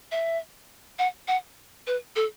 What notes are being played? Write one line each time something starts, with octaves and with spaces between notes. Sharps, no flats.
E5
F#5
F#5
B4
A4